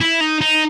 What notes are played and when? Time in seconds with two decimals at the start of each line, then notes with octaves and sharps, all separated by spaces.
0.01 E4
0.21 D#4
0.41 D#4